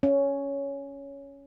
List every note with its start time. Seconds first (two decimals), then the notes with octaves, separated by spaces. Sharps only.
0.03 C#4